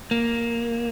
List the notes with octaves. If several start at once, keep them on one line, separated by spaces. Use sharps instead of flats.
A#3